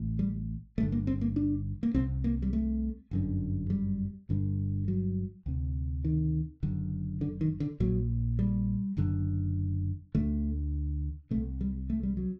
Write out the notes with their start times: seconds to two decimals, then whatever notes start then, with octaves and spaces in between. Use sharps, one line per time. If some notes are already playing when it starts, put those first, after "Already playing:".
Already playing: A1 A2
0.19 G3
0.78 G1 G2 D3 A3
0.92 A#3
1.07 C4
1.21 A#3
1.36 D4
1.83 A#3
1.94 C2 C3 C4
2.24 A#3
2.42 G3
2.53 A3
3.11 G1 F#2 D3
3.70 G3
4.29 G1 G2 D3
4.88 F#3
5.46 D2 C3
6.04 D#3
6.63 F#1 F#2 D3
7.21 D3
7.41 D#3
7.60 D3
7.80 A#1 A#2 F#3
8.39 G3
8.97 F#1 F#2 D3
10.15 D2 D3 A3
11.31 C2 C3 A3
11.61 G3
11.90 A3
12.03 G3
12.17 F#3